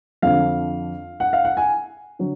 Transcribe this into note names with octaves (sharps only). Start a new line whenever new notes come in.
F2 D3 F3 F5
F#5
F5
F#5
G#5
D3 F#3